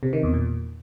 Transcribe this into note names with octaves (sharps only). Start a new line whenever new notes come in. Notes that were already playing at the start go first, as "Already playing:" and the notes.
C3
D#3
E2
A#2